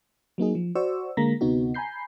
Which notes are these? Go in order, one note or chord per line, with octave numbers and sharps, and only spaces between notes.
F#3 A#3 D#4 G#4
F3
F#4 C5 D5 C#6 E6
D3 G#3 A#3 A#5 A#6 B6
D2 C3 B3 D#4 F#4
G#5 A#5 B5 G6 C7